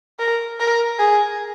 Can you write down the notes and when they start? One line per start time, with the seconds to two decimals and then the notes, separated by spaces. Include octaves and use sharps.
0.19 A#4
0.60 A#4
0.99 G#4